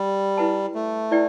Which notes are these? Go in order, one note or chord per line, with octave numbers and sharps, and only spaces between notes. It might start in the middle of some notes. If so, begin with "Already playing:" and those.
Already playing: G3
E4 B4 F#5 A5
A3
E4 B4 D5 G5